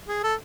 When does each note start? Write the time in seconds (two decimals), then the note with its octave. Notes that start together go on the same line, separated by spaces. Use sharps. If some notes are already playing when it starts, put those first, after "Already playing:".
0.08 G#4
0.23 A4